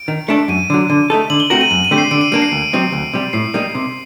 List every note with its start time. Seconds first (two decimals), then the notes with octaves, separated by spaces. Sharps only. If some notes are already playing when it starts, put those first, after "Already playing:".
Already playing: D7
0.08 D#3
0.28 A3 D4 A4
0.48 F#2 D#7
0.70 D3 F#3
0.90 D3
1.10 A3 D#4 A4
1.30 D3 F#7
1.40 G7
1.50 A3 C4 F#4 A#4 F#7
1.61 D#7
1.71 F#2 F#7
1.85 D#7
1.91 D3 A3 C4 G4
1.98 C7
2.11 D3 D7
2.21 D#7
2.32 G3 A#3 D4 D7
2.42 C7
2.52 D2
2.73 C3 F#3 C4 D#4
2.92 D2
3.13 C3 G3
3.33 A2 C7
3.54 G3 A#3 D#4
3.75 C3